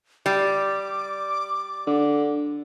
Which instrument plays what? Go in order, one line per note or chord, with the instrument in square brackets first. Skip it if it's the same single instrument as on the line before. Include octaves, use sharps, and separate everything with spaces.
[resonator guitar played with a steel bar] G3 [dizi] D6
[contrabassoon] D3